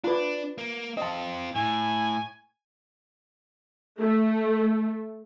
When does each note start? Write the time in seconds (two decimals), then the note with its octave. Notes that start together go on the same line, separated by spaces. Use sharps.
0.04 D4 F4 B4
0.58 A#3
0.97 C4 F4 D#5 A5
1.55 A2 G#5
3.98 A3